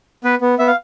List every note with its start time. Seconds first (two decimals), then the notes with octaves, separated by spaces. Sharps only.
0.24 B3 B4
0.41 B3
0.59 B3 E5
0.67 F5